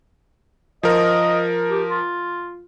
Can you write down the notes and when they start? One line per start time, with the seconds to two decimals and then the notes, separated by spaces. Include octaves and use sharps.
0.83 F3 A#4 D#5
1.70 G4
1.88 F4